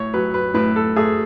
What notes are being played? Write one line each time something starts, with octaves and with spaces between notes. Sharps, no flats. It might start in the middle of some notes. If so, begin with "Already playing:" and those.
Already playing: A2 C#5
F#3 B4
B4
A2 B4
A4
A3 G#4